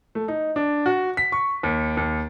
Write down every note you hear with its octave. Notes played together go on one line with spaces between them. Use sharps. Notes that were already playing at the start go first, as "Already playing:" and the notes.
A3
D#4
D4
F#4
B6
C#6
D#2
D#2